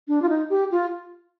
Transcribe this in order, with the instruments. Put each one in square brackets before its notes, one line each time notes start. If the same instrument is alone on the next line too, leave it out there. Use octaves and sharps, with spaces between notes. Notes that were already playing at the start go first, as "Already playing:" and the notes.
[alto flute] D4
F4
D#4
G4
F4